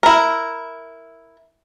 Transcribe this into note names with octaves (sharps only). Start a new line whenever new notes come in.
E4 A#4